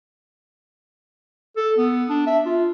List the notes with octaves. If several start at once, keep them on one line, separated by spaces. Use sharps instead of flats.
A4
B3
D4
E5
F4